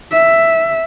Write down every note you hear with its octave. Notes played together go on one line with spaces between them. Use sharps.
E5